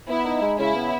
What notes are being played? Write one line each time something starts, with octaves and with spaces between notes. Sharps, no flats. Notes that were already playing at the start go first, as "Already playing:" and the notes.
B3 E4
D#4
G#3
C#3 E4
B3